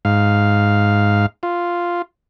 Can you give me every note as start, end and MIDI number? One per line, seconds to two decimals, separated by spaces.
0.05 1.26 44
0.05 1.26 77
1.43 2.02 65